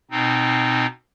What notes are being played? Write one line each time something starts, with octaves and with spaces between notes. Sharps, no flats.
B2 C4 D#4